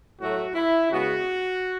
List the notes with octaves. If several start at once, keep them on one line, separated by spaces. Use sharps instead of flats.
A2 F#3 A3 F#4
E4
C#3 G#3 B3 F#4